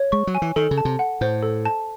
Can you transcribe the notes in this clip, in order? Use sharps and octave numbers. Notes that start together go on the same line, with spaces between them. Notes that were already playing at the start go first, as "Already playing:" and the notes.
Already playing: C#5
G#3 C#6
F#3
G#5
E3
D#3 A4
C#3
A5
C3
F#5
A2 C5
A4
A5